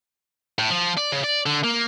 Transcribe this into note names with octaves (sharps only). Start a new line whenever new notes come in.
A2
F3
D5
C#3
D5
D3
A#3